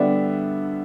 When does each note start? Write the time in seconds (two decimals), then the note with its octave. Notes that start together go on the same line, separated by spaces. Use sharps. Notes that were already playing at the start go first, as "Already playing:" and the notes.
Already playing: D3 G3 B3 D4 E5